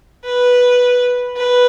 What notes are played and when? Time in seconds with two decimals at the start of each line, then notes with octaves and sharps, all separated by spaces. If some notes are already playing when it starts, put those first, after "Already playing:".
0.25 B4
1.36 B4